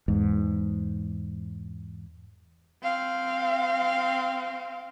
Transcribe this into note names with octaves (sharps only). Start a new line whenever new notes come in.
E2 G#2
C4 F5